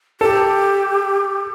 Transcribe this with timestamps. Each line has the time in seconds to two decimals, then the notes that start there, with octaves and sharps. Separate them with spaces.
0.21 G4 A4